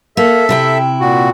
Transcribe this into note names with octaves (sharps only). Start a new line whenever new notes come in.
A#3 A4 E5
C3 E4 G5
A#2 F#4